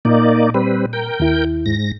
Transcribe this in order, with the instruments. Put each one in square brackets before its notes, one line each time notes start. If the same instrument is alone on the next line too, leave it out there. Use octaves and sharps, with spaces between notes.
[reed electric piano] A#2 [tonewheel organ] A#3 D#4 D5
[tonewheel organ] G3 C4 B4
A#4 G5 G6
[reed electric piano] D#2 E4
[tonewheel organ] G#2 A#6